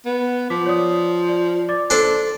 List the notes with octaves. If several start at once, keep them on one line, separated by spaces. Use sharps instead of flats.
B3
F3 D6 B6
C#5 D5 D#6
D5
D5 D6 A6
D4 A4 C5